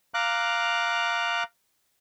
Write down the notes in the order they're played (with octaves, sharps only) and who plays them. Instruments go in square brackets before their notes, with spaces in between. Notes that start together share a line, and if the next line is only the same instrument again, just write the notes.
[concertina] F5 A#5 D6 F#6